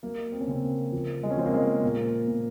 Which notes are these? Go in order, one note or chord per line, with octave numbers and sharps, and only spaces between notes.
F#3 A#3
C4
C#4
C#3 C4
A#3
F3 A#3
G#3
C#4
F3 C4
A#3
G#3
A#2 A#3
A#2